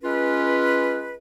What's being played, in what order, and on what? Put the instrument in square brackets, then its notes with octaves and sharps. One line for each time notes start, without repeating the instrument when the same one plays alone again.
[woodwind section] G#3 C#4 F4 B4